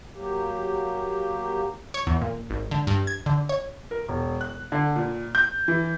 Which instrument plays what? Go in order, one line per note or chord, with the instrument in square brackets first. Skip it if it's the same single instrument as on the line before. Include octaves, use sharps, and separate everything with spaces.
[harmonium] F#3 A#3 G4
[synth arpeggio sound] C#5
E2
A#2
G#1
D3
G2
G#6
D3
C#5
[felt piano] A#4
E1
F#6
D3
A#2
G6
E3